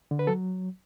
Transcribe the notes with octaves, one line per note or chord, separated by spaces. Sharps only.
D3
B4
F#3 A4